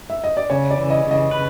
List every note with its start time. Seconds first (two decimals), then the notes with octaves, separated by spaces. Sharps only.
0.10 E5
0.24 D#5
0.37 D5
0.50 C#3 C#5
0.71 D5
0.77 E3
0.90 D#5
1.05 C#3
1.11 D#5
1.31 B4